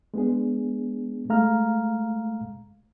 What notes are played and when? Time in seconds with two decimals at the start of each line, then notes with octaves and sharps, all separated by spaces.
0.14 G#3 B3 D4 G#4
1.29 G#3 A3 F5 A#5 F6